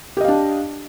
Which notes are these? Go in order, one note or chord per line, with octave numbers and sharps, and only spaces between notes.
D4 G4 D#5 F5